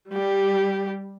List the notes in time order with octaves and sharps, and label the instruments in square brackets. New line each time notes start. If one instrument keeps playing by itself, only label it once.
[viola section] G3 [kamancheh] G4